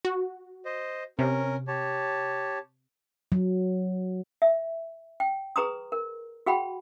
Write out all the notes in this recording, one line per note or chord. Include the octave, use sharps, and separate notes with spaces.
F#4
C5 D#5
C3 C#4 A#4
G4 C#5 A5
F#3
E5
G5
G#4 B4 A#5 C6 D#6
A#4
F#4 G#4 F#5 G5 B5